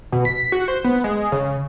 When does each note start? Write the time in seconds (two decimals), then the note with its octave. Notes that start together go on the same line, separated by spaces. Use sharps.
0.12 B2
0.25 B6
0.52 F#4
0.68 C5
0.84 B3
1.04 G#3
1.32 C#3